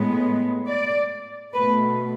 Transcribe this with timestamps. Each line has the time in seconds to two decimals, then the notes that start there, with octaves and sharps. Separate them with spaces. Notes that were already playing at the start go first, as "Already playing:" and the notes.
Already playing: A2 G#3 B3
0.67 D5
1.54 B2 A3 B4